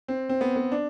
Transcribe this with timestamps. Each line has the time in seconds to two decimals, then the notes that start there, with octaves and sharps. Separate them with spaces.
0.08 C4
0.29 C4
0.41 B3
0.56 B3
0.72 D4